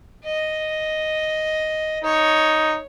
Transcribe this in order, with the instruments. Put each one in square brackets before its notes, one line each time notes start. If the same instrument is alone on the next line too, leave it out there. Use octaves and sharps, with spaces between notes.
[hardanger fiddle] D#5
[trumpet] D#4 [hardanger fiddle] C#5